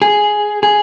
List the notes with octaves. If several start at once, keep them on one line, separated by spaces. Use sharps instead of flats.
G#4
G#4